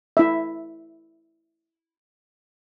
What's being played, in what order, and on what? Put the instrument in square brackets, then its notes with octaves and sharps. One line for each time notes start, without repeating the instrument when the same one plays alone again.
[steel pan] E4 E5